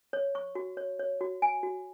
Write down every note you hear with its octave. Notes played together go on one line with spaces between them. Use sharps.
C#5
C#6
F#4
C#5
C#5
F#4
G#5
F#4